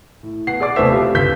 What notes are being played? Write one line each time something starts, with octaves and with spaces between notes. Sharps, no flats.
A2
B2 F#5 C7
G#4 D5 D6
F1 B2 A3 C4 C5 E5
C4 F4 G4
G1 C#2 F4 G6 B6